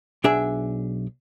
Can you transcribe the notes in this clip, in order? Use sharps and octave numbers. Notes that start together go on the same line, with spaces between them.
B1 D4 G#4 E5